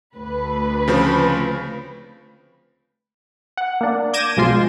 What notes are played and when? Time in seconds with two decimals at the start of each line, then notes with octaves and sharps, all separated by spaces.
0.15 D2 B4
0.88 C#3 F3 C4
3.57 F#5
3.81 A#3 D4
4.13 D6 G6 G#6 A#6 D#7 E7
4.37 B1 F3 G#3 F4 C6